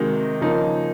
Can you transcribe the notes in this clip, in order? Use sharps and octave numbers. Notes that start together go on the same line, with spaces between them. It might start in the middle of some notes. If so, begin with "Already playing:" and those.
Already playing: C3 D#3 G#3 D#4 F#4
C#3 F3 A#3 D#4